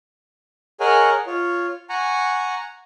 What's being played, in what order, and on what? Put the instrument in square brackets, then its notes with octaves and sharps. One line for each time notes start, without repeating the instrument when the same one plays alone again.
[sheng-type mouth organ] G#4 A#4 C#5 D#5 F#5 G#5
F4 C#5
F#5 G#5 A#5 C#6